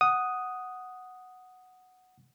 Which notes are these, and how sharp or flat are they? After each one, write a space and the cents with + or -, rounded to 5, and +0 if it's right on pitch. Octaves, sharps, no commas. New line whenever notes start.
F#5 +0 D#6 +0